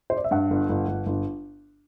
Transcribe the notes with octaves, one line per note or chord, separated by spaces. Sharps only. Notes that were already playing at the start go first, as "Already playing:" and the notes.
C5
D5
E5
G2 F#5
G1
G1
G1
G1